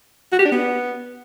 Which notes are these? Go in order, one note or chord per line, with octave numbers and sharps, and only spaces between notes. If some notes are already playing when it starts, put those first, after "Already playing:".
F#4
G4
D4
B3